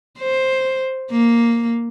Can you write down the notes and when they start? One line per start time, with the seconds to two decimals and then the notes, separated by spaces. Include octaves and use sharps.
0.19 C5
1.11 A#3